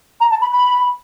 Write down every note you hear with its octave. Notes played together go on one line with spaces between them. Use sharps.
A#5
A5
B5
B5